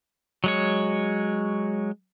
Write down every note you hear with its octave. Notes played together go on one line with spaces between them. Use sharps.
F#3 G#3 C#5